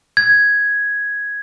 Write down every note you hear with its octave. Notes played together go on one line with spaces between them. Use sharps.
G#6